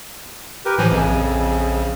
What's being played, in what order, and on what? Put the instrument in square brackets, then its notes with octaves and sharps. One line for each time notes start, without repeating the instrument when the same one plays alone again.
[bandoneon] G4 A#4 B4
[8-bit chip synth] A2 E3 F3 [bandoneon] G#5
[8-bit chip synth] A#1 [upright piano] F2 G#5 [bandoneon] C#3